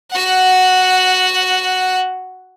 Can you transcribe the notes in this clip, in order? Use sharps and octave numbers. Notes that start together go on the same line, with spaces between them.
F#4 F#5